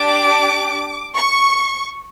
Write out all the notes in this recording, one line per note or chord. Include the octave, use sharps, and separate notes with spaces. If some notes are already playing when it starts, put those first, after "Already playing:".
Already playing: D4 G4 D6
C#6